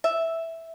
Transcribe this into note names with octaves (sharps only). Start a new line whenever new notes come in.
E5